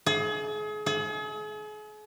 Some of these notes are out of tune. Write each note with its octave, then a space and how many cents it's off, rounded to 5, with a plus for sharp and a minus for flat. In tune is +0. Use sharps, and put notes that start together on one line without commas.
G#4 +35
G#4 +40